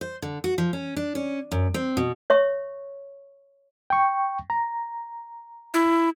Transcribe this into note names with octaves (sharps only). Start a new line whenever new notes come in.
C5
D3
F#4
F3
C#4
D4
C#4
F#2
C4
B2
C#5 E5 C#6
G5 C#6
A#5
E4